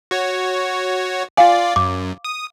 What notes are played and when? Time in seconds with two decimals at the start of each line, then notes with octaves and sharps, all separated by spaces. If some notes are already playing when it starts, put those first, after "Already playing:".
0.11 F#4 C#5
1.37 F4 D5 F5 G#5
1.76 F#2 D6
2.25 D#6